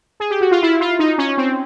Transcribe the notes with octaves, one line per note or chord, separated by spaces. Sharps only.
G#4
G4
F#4
F4
E4
F4
D#4
C#4
C4